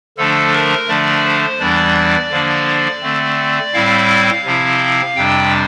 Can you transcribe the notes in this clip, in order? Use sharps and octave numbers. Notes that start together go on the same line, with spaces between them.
D3 F3 A3 D4 A4
A#4
D3 F3 A3 D4 D5
C5
E2 E3 G3 D4 D5
D3 F3 A#3 D4
D3 A3 C4
A2 G3 C4 E4 F5
C3 F3 C4 E4
F2 C3 G3 D4 G5